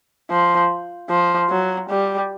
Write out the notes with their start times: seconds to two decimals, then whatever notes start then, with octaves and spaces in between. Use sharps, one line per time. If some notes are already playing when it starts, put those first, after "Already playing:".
0.30 F3
1.09 F3
1.50 F#3
1.89 G3